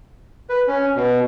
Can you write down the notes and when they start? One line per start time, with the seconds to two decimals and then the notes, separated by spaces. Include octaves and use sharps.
0.49 B4
0.68 C#4
0.96 B2